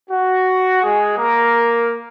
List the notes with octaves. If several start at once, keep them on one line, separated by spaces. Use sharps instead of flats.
F#4
G#3 G#4
A#3 A#4